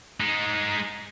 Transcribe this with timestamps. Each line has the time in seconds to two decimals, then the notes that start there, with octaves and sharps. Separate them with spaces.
0.20 G#3 D#4